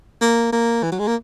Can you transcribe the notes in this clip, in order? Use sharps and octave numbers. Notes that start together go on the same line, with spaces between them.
A#3
A#3
E3
F#3
G#3
A#3